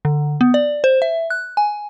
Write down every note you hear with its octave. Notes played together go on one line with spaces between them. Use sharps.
D3
B3
D5
C5
E5
F#6
G#5